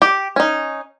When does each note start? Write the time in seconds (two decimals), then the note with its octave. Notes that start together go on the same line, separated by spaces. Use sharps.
0.02 G4
0.36 C#4 D#4